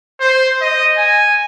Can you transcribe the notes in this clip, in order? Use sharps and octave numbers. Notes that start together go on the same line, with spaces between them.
C5
D#5
G#5